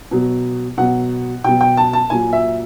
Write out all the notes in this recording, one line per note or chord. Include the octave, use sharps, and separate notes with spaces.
B2 F#3
B2 F#3 F#5
B2 F#3 G5
G5
A5
A5
A#2 F#3 G#5
E5